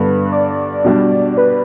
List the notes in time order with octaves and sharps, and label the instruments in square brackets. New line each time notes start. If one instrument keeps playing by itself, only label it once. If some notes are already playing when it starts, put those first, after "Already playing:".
Already playing: [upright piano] G2 D3 B3 [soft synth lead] B4
[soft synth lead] D5
[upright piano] B2 G3 D4
[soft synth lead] B4